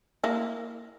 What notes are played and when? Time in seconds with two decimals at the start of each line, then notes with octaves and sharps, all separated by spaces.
0.24 A#3 E4